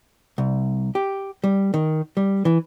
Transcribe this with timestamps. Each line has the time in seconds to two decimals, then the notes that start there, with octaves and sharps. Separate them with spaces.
0.38 C2
0.95 G4
1.44 G3
1.74 D#3
2.17 G3
2.45 E3